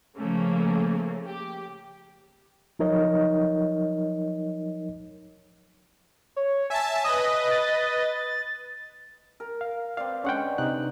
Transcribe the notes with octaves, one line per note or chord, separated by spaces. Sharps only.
C#3 F3 A3 A#3 C#4
G4
F3 F#3 D#4 A#4 C#5 D#5
C#5
E5 G#5 A5
B4 D#5 D#6
A6
A#4
F5
C4 B4 D5 F5
D3 G#3 C#4 F#5 G5 C#6
C3 D#4 F#6